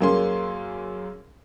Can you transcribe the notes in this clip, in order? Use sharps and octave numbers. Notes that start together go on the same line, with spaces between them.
F#2 A#3 C#4 G#4 C6